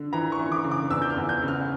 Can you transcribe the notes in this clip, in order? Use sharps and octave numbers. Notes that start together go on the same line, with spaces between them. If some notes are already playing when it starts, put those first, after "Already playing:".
Already playing: D3
E3 A#5
C#6
E3
D6
C#3
D6
E2 E6
G6
F6
E2
G6
C#3
F6